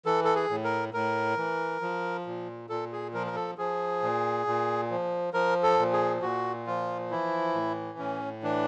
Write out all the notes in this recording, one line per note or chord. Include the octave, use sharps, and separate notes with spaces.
E3 A4
A4
G#4
A2
A#4
A2 A#4
E3
F3
A#2
A#2 A4
G#4
F3 A#4
A#4
A4
F3 G#4
A#2
A#2
F3
F3 A#4
A4
A#2
G#4
A#2 F#4
F3 F4
E3 E4
A2
A2 C#4
E3 D4